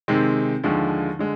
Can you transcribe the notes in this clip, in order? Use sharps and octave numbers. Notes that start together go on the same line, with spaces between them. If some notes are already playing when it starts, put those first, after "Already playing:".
C3 D#3 G#3 C4
D#2 D3 F3 G#3
D3 G#3